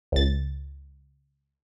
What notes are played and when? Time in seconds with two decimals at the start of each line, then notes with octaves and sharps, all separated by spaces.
0.12 C#2 A6